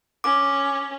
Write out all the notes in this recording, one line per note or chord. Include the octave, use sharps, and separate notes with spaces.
C#4 D6